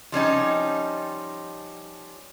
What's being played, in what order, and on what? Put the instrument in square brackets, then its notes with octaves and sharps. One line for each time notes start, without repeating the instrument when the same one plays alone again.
[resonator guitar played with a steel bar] F3 G3 C#4 D#4